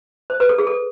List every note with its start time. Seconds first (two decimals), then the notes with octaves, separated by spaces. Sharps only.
0.30 C5
0.40 B4
0.49 A4
0.58 G#4
0.67 A4